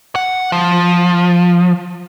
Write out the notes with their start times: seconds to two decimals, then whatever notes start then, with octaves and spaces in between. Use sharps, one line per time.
0.15 F#5
0.52 F3